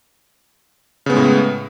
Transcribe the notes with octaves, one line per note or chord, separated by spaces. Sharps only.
A2 C#3 G#3 B3